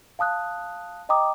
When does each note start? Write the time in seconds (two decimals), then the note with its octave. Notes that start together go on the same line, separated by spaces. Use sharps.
0.19 F5 A5 D#6 F#6
1.09 D#5 G5 A#5 D6 D#6